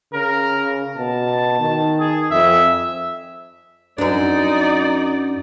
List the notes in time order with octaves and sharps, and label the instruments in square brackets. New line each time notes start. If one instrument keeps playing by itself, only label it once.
[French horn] C#3 [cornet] A#4
[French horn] B2 [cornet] A5
[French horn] D#3
[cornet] G#4
[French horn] F2 [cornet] E5
[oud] F#2 D4 [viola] D#4 D5